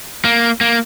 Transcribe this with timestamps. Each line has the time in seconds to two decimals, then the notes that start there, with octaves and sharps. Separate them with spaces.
0.25 A#3
0.61 A#3